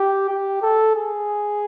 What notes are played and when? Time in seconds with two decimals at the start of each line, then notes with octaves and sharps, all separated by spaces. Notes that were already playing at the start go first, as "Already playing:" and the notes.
Already playing: G4
0.29 G4
0.62 A4
0.95 G#4